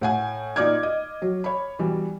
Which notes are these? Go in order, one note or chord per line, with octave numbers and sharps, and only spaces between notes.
A2 F#5 G#5
A#2 D#4 D5 D6 F6 G#6
D#5
F#3
C#5 B5
B2 E3 G3